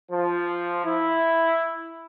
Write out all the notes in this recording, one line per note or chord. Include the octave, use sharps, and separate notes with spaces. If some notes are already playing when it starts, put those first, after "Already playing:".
F3
E4